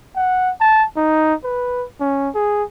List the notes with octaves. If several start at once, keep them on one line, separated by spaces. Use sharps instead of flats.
F#5
A5
D#4
B4
C#4
G#4